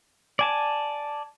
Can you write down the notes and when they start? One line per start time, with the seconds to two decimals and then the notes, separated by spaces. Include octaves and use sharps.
0.39 D5 G#5 A5